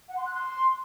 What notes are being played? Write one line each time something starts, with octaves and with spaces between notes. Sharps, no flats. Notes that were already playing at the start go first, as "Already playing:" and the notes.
F#5
C6
F#6
C6